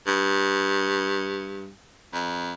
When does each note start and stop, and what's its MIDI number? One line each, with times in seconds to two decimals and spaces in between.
0.07 1.70 43
2.13 2.54 41